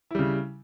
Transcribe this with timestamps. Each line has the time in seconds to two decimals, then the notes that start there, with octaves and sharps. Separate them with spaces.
0.11 E4
0.15 G3
0.19 C#3